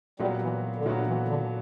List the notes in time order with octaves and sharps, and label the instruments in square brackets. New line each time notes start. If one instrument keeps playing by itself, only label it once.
[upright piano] A#2 F#3 B3 F#4 [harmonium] G3
[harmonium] E3
D3
[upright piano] A#2 F#3 B3 F#4 [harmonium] C#3
[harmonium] E3
D3